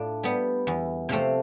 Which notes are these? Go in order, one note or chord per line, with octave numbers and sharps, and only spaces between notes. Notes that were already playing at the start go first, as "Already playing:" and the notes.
Already playing: A2 A3 D4 F4
G3 B3
E2
C3 F3 A3 C4